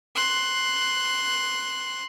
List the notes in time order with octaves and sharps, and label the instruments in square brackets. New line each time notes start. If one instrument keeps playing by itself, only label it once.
[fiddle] C6 F#6